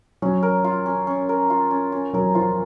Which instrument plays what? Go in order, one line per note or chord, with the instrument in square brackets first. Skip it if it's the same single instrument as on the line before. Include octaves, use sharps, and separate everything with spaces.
[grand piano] F#3 [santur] C#4
[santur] A#4
F4
C#4
C#4
A#4
F4
C#4
C#4
[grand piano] F#3 [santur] A#4
[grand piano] F3 [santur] F4